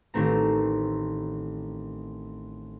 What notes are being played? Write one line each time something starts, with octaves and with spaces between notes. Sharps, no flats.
A1 D#3 A3 C4 A#5